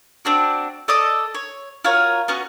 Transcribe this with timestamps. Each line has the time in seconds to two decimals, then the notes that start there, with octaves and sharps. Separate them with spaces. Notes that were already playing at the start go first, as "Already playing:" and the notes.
0.25 C4 D4 F#4
0.88 A4 D5 D#5 D#6
1.35 C#5
1.84 F4 F#4 A#4 C#5
2.28 B3 C#4 F#4